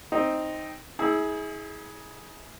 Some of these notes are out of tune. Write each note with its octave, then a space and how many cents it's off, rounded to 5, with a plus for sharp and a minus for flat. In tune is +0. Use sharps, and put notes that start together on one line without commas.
C4 +0 D#4 +0
E4 -40 G#4 +10 E6 +0